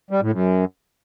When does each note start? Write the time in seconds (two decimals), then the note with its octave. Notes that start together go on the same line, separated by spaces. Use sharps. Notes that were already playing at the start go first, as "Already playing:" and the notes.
0.11 G3
0.21 A2
0.32 F#2